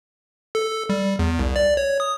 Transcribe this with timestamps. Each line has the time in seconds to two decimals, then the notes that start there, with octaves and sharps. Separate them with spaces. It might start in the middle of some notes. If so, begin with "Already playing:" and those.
0.55 A4
0.89 G3
1.19 E2
1.39 C2
1.56 D5
1.77 C#5
2.00 D#6